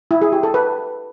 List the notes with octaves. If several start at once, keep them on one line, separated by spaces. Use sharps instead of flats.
E4
G#4
G4
A4
B4